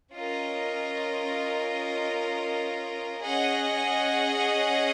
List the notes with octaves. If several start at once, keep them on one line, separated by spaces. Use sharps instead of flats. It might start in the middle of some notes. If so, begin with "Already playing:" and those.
C#4 F4 A#4 D#5
C#4 G#4 D#5 F#5